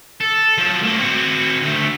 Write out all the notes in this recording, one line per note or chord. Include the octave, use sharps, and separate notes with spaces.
A4
F3 F#3
A3 A#3
C4 F#4
D2 A3